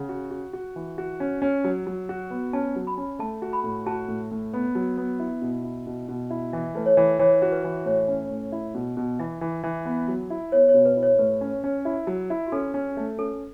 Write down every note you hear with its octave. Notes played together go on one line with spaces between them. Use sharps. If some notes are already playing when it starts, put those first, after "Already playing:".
Already playing: C#3 F#5
F#4
F#4
F#4
E3
F#4
C#4
C#4
F#3
F#3
F#4
B3
C#4 A5
F#3
B5
C#4
A3 A5
F#4
B5
A2
F#4 A5
A2
A2
B3
F#3
B3
E4
B2
E4
B2
B2
E4
E3 E5
A3 B4
C#5
E3
E3 C#5
F#4
B4
E3
A2 C#5
C#4
A2
E4
B2
B2
E3 E5
E3
E3
B3
F#3
E4
B3 C#5
C#5
B2
B4
E4
C#5
A2 B4
C#4
C#4
E4
F#3
E4
F#4
C#4 A4
C#4
A3
C#4 A4